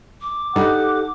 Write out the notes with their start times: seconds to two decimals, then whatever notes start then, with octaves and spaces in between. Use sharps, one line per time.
0.21 D6
0.56 G2 D#4 G4 A4 F#5